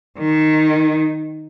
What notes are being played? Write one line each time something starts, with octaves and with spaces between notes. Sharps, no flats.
D#3